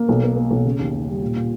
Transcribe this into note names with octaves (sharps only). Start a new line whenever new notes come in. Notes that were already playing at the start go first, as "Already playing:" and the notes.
Already playing: A#3
B1
A#3
A#3
B1
C#3
D#2
D#2
G3
A#2
A#2